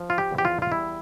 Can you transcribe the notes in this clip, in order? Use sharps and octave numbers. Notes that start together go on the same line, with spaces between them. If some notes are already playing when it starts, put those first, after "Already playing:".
Already playing: F3
F4
G4
E2
G4
F4
F4
G3 E4